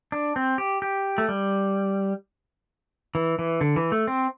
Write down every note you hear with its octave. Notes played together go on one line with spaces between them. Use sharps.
D4
C4
G4
G4
A3
G3
E3
E3
D3
E3
A3
C4